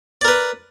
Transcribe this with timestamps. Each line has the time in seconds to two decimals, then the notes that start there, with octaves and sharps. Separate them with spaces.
0.21 D5
0.25 A#4
0.28 B4